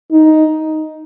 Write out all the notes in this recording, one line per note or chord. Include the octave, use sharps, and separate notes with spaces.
D#4